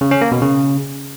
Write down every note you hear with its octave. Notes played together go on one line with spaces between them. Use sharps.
C#3
C#4
A#3
B2
C#3